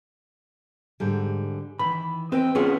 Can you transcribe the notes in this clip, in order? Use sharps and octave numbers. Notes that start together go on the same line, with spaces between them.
G#2 D3 G3
D#3 E3 B5
C4 B4 D#5 G5
B3 C#4 F4 G#4